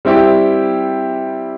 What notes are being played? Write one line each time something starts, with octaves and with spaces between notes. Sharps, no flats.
G3 C4 E4 G4